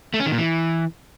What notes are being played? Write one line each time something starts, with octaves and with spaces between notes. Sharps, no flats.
A3
C#4
D#3
A#2
E3